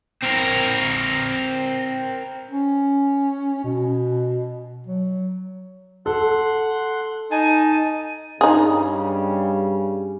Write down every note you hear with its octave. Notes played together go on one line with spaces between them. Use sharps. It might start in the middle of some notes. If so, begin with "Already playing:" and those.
C4 A#4
C#4
B2
F#3
A4 F#5 C6
D#4 G#5 A5
G2 C#3 G3 D#4 G#4